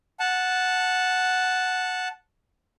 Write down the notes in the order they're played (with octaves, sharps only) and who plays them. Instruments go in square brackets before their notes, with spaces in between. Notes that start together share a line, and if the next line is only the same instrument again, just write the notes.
[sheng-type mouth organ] F#5 A5